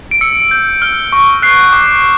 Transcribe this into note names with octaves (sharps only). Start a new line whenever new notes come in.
D7
E6 C#7
G6
F6
C#6
F#6 C7
D6